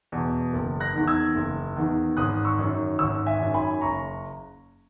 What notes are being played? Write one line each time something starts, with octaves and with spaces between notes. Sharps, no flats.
E2 B2
F#1
F#6 A#6
E2 D#3
E6 G#6
F#1
E2 D#3
G#1 D#6 F#6
C#6 E6
F#2 D#3
G#1 C#6 E6
E5 G#5
F#2 D#3
G#5 B5
F#1 A#5 C#6